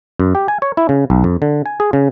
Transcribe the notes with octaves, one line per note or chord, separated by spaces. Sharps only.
F#2
G4
G#5
C#5
E4
C#3
B1
F2
D3
G#5
G#4
C#3